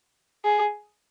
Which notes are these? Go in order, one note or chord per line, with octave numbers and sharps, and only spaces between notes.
G#4